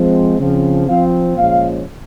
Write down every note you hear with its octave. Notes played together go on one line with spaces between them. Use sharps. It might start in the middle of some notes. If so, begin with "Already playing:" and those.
Already playing: F3 G#3 C4
C#3 F3 C4
F3 C4 F5
A#2 F3 G#3 C#4 F5